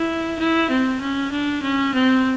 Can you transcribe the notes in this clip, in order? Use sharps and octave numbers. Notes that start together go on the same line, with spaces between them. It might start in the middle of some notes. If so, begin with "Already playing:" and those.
Already playing: E4
E4
C4
C#4
D4
C#4
C4